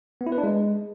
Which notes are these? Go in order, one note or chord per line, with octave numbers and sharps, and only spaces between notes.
B3
E4
B4
D4
G#3